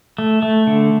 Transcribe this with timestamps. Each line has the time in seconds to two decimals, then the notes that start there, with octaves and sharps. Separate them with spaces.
0.19 A3
0.43 A3
0.67 D3